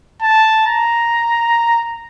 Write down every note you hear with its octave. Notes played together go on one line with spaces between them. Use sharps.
A5
A#5